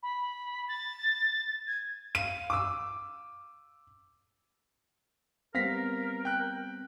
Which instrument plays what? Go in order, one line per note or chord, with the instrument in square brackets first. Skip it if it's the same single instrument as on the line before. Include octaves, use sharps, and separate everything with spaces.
[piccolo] B5
A6
G#6
[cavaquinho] F5 [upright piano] D#7
[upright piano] D6 E6
[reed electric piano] G3 B3 C4 [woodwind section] A#4 [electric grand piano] F5 A#6 B6
[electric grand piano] G5 F#6